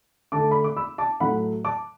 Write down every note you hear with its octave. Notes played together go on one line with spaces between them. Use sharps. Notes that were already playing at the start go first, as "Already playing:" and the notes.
D3 A3 A5 D6
B5
D6
B5 E6
A5 D6
A2 F#3 A3 F#5 B5
A5 D6